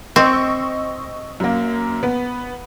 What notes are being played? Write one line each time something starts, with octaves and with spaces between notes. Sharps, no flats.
C4 D#5 C#6 E6
F#2 A#3
B3